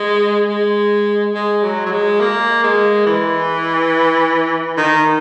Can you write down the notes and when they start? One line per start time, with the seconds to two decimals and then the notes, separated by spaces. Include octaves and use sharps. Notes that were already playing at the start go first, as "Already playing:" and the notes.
Already playing: G#3
0.50 G#3
1.34 G#3
1.63 F#3
1.86 F#3
1.92 G#3
2.20 A#3
2.63 G#3
3.06 E3
4.77 D#3